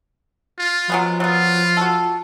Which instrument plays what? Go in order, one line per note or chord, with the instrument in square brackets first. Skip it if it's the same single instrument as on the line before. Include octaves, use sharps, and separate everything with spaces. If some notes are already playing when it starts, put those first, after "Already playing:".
[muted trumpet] F4
[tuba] F3 [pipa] F#3 G#3 B3
[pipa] F#3 B3 [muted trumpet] F4
[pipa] F#4 A4